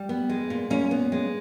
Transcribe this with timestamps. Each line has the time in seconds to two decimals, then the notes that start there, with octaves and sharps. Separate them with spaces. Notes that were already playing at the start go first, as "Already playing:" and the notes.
Already playing: G3
0.09 B3
0.29 G#3
0.50 A#2
0.70 A#2 C#4
0.91 B3
1.12 G#3